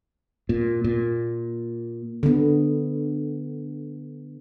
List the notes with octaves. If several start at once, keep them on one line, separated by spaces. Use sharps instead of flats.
A#2
A#2
D3 B3